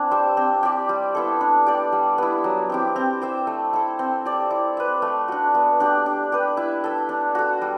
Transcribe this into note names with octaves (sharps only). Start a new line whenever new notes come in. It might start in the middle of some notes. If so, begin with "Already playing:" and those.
Already playing: C4 D4 E4
G4 C5 E5
C4
G4 D5
G3
B3 E4 A4
D4
G4 D5
G3
B3 E4
F#3
C4 E4 G4
C4
G4 C5 E5
A3
E4 A4
C4
G4 D5
E4
B4 E5
A3
D4 F#4
B3
D4 G4
D4
G4 B4
E4
A4 E5
D4
F#4 A4
G3